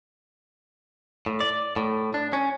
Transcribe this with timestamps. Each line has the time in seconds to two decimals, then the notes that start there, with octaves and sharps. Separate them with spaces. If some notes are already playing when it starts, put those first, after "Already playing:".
1.26 A2
1.40 D5
1.76 A2
2.14 D4
2.33 C#4